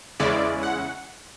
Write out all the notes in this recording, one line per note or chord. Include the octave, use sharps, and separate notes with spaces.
E2 C#3 G#3 C#4 E4 D5
F#5